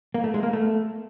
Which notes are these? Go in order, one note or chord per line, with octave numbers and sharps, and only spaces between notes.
A#3
A3
G#3
A#3
A3